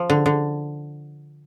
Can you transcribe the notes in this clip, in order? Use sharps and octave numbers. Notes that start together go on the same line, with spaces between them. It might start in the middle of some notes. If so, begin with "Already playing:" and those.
Already playing: F3
D3
D3